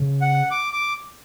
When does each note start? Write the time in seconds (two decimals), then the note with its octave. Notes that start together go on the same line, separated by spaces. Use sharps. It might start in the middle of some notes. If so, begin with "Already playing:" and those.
Already playing: C#3
0.22 F#5
0.51 D6
0.73 D6